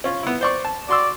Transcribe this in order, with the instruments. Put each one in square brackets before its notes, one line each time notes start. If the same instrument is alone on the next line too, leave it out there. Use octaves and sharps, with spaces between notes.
[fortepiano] C#4 F4
B3 E4
C5 D5 C#6
A5
[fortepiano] F#4 C6 E6 [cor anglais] D5